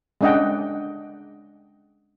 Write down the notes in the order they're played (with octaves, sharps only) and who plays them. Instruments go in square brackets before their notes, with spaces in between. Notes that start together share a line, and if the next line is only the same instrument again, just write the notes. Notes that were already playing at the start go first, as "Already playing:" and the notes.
[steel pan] G#3 C#4 D4 D#5 F#5 G5